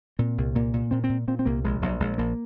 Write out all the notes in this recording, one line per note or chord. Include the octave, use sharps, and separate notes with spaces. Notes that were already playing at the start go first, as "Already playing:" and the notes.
A#2 C4
C2
A#2 A#3
A#2
A#2 C4
C4
A#2
A#2 C4
C4
C2 A#3
A#1 G#3
A#1 F#3
A#1 G#3
A#1 A#3